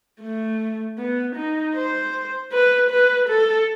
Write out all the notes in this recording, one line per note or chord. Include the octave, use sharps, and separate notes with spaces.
A3
B3
D#4
C5
B4
B4
A4